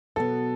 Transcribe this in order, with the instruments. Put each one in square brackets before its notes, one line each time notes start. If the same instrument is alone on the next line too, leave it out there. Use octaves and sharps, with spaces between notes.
[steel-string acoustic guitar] B2 F#3 B3 [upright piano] A4